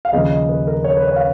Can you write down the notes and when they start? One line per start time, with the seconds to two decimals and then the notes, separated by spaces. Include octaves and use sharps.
0.05 F5
0.12 D#2 C#3 F3 B3 D#5
0.31 D#5
0.49 B4
0.67 A#4
0.84 C#5
0.97 B4
1.07 C#5
1.16 F5